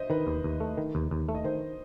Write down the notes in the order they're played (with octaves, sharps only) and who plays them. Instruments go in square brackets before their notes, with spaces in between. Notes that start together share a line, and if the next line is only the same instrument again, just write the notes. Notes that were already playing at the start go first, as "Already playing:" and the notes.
Already playing: [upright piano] C5 D#5 E5
[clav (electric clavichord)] D#3 [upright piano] B4
[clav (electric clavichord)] D#2
D#2
A3
D#3
D#2
D#2
A3
[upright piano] D#5
[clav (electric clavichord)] D#3 [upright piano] C5